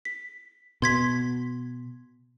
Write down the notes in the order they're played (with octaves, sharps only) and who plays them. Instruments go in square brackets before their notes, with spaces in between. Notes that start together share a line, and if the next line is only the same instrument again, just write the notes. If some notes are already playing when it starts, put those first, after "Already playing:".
[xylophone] B6
[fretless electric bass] B2 [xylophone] C6 G#6 B6